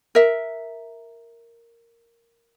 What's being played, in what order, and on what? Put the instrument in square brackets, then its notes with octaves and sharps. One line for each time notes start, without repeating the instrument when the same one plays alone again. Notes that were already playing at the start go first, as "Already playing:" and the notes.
[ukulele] A#4 E5